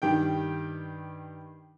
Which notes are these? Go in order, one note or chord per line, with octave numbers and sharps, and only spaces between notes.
G2 D#3 G4 G5